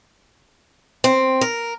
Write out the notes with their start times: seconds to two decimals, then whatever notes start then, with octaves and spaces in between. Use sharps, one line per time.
1.04 C4
1.41 A#4